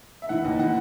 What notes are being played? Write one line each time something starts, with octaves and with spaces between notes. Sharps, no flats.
E5
E3 F#5
D#2
E3 F#5